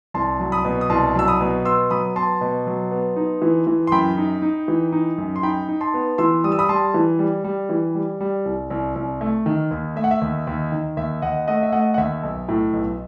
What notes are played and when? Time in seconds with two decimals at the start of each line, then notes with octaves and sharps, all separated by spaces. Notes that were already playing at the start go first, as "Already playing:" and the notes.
0.14 C2 A5 C6
0.40 F#3
0.52 B5 D#6
0.65 B2
0.81 D#6
0.90 C2 A5 C6
1.15 F#3 E6
1.28 B5 D#6
1.40 B2
1.65 B3 C6 E6
1.90 F#3 B5 D#6
2.16 B3 A5 C6
2.41 B2
2.67 F#3
2.91 B3
3.16 D#4
3.42 E3
3.67 E3
3.87 C6
3.92 F#2 G5 B5
4.17 D#4
4.42 D#4
4.68 E3
4.93 D#4
5.18 F#2
5.36 C6
5.43 D#4 G5 B5
5.69 D#4
5.81 A5 C6
5.94 B3
6.18 E3 C6 E6
6.44 G3 D#6
6.52 E6
6.59 B5 D#6
6.69 G3 A5 C6
6.94 E3
7.19 G3
7.44 G3
7.69 E3
7.95 G3
8.20 G3
8.45 C2
8.70 C2
8.96 C2
9.21 A3
9.46 D#3
9.71 D#2
9.96 A3 E5
10.04 F#5
10.11 E5
10.22 D#2
10.47 D#2
10.72 D#3
10.97 D#2 E5
11.22 D#2 D#5 F#5
11.47 A3 D#5 F#5
11.63 E5
11.72 A3 D#5 F#5
11.94 F#5
11.98 D#2 E5
12.23 B1
12.48 A2
12.73 B1